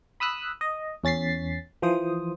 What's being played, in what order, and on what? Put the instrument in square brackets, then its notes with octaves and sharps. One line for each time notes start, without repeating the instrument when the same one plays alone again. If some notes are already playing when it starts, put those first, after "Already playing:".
[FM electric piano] B5 D#6 E6 F#6
D#5
E2 C#4 A6 B6 C7
E3 F3 C5 D#6